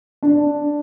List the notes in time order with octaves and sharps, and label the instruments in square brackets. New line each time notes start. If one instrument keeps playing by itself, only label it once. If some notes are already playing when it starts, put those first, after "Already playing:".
[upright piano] D4